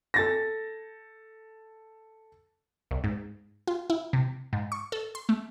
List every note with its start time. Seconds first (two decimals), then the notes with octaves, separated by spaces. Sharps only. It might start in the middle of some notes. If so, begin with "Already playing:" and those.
0.14 A4 A6 A#6
2.91 C2
3.04 G#2
3.67 F4
3.90 E4
4.13 C3
4.53 G#2
4.72 C#6
4.92 A4
5.15 C6
5.29 A3